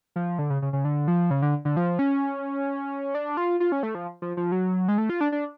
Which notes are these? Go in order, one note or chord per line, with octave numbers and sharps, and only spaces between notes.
F3
D3
C#3
C#3
C#3
D3
F3
C#3
D3
D3
F3
C#4
D4
F4
F4
C#4
A3
F3
F3
F3
F#3
G#3
A3
F4
D4
D4